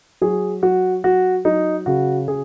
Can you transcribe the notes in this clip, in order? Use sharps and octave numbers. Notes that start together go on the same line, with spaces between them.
F#3 G#4
F#3 F#4
F#3 F#4
F#3 D#4
C#3 F#4
C#3 G#4